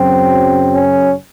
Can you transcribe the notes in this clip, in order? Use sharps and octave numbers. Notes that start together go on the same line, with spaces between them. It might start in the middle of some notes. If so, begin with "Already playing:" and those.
Already playing: F#2 C#3 F#3 C4
C#4